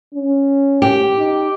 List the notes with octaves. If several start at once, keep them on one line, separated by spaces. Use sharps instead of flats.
C#4
G4
D#4